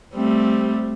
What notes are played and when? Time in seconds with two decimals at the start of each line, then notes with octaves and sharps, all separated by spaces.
0.14 G3 A3 C4